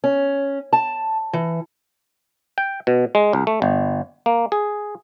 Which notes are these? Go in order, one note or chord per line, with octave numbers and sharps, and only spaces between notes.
C#4
A5
E3
G5
B2
G#3
C2
A3
G1
A#3
G#4